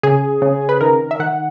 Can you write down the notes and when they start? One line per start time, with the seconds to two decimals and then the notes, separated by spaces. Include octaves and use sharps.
0.03 C#3 G#4
0.42 C#3
0.69 B4
0.81 D#3 A#4
1.11 E5
1.20 D#3 F#5